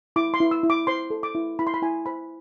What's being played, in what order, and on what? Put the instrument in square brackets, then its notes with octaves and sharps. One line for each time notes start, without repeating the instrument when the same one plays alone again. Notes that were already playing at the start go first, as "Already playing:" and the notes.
[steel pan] E4 D6
C6
E4
E6
E4
D6
C5 C6
A4
D6
E4
E4 B5
C6
B5
E4 G#5
C5 B5